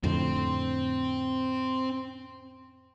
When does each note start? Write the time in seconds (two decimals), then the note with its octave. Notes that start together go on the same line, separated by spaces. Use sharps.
0.04 F2 A2 D3 C4